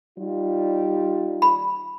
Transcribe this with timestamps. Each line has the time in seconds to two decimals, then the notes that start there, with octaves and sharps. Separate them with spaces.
0.18 G3 D#4 F4
1.42 B5